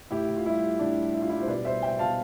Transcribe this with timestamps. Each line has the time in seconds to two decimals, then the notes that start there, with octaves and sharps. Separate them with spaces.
0.11 A2 E4 G4
0.29 A2
0.37 F4
0.46 G3 E4
0.63 G3
0.79 A2 D4
0.96 G3
1.15 G3 E4
1.22 F4
1.29 G3 E4
1.41 C5
1.48 B2 B4 D5
1.65 G3 C5 E5
1.82 G3 E5 G5
1.99 B2 F5 A5